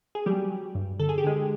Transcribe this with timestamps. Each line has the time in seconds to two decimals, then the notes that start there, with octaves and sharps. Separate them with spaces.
0.15 G#4
0.26 F#3 G3 G4
0.50 F#3
0.75 G2
1.00 D3 A4
1.09 G#4
1.18 G4
1.24 D3 G#3 G#4